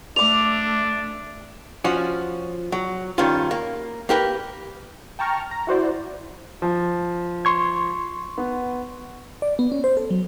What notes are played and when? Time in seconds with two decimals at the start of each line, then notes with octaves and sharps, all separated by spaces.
0.16 A3 D4 D5 D6 F7
1.84 F3 C#4 F#4
2.72 F#3
3.18 G2 D#3 C#4 F4
3.51 A#3
4.09 A#3 G4 A#4 B4
5.19 G5 A5 A#5 C#6 F6
5.51 A#5
5.67 E4 F#4 C5 D5
6.62 F3
7.45 C6 C#6 G#6
8.38 B3
9.42 D5
9.59 B3
9.72 C#4
9.84 C5
9.97 A4
10.11 F#3